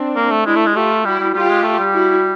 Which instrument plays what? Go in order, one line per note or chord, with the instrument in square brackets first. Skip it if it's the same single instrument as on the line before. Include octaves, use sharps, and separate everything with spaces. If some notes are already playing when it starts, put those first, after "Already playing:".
Already playing: [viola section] C4 D4
[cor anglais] A#3
A3
[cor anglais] G#3 [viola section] D4 E4
[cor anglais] A3
G#3
[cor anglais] A3 [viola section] F4 G4
[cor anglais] G3 [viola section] E4 F#4
[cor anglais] G3
[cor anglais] G3 [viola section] F4 G4
[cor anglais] G#3
A3
G3
[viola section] E4 F#4